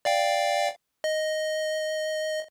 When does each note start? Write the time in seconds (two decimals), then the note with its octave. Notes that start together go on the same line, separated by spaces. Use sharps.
0.05 D5 F5 G5
1.04 D#5